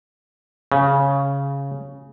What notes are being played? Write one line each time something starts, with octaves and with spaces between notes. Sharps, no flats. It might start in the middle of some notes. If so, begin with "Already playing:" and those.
C#3